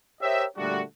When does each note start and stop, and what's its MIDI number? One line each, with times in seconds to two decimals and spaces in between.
0.20 0.44 67
0.20 0.44 70
0.20 0.44 72
0.20 0.44 73
0.20 0.44 75
0.20 0.44 76
0.57 0.80 46
0.57 0.80 50
0.57 0.80 55
0.57 0.80 57
0.57 0.80 62
0.57 0.80 66